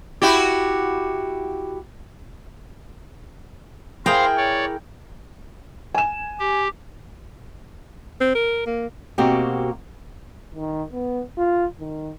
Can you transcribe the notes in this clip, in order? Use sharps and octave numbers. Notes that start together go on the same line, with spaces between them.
E4 F#4 G4
E4 G#4 A#4 C5 F5 G5 A#5
C#5 D5
G#5 E7
G4
C4
A#4
A#3
B2 A#3 C4 F#4 G4
D#3
B3
F4
D#3